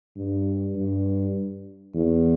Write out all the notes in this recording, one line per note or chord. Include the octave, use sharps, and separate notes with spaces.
G2
G2
E2